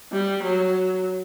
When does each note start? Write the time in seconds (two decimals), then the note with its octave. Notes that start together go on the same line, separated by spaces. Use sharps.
0.12 G3
0.42 F#3